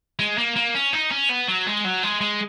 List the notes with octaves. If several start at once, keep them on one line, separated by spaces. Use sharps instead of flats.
G#3
A#3
A#3
C#4
D#4
C#4
B3
F#3
G#3
F#3
G#3
G#3